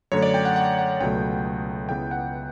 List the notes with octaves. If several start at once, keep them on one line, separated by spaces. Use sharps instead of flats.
F#2 D3 A3 C#5
D5
G5
F#5
F#5
F#5
C#2 B2 F#3 A3 G5
C#2 C#3 E3 B3 G5
F#5